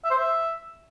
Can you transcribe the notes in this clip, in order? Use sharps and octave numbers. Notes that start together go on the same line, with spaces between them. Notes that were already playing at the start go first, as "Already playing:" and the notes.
E5
C5
E5